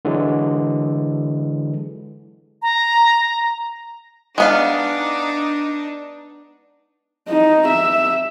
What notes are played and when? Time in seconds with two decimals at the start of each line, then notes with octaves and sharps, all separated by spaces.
0.05 D3 E3 F#3 G#3
2.62 A#5
4.38 G#3 B3 D4 D#4 F5
7.29 D#4
7.68 E5